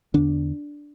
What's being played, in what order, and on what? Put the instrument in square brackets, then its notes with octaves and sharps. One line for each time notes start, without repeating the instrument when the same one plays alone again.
[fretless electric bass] E2 D3 D4